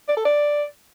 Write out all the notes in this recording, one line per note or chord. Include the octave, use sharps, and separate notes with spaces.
D5
A4
D5